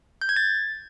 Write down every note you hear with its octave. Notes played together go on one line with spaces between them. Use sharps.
G6
G#6
A6